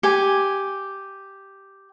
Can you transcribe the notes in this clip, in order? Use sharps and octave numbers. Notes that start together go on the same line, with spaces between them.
G4 G#5